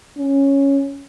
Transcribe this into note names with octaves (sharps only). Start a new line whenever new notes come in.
C#4